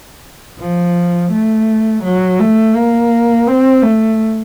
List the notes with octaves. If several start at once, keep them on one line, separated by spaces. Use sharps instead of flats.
F3
A3
F#3
A3
A#3
C4
A3